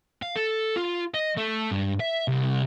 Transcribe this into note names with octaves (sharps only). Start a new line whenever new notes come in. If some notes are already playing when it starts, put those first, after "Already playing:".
F5
A4
F4
D#5
A3
G2
E5
C2